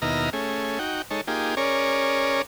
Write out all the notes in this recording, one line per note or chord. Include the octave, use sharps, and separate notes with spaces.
D#2 B2 E4 D#5 A#5 F6
A3 C#4 G#4
D#4 F#4 G5
G#3 D#4 A4 C#5
A#3 D#4 F4 G4 G#4
C#4 G#4 A#4 C#5 D5